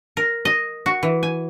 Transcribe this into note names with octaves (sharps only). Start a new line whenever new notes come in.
A#4
D#5
F#4
E3
G#5